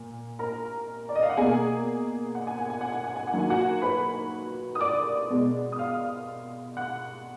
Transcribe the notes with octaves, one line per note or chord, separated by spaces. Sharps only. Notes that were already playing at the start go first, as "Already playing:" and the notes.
Already playing: A#2
A#4 A#5
D5
D#5
F5
F#5
B2 A#3 G#4 G#5
F#5
G#5
F#5
G#5
F#5
G#5
F#5
G#5
F#5
D#3 F#3 A#3
G#5
F#4 F#5
B4 B5
D#6
D5 D6
B2 G#3 B3
D#6
F5 F6
F#5 F#6